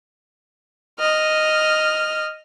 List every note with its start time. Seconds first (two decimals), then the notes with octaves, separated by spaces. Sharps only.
1.00 D#5 F6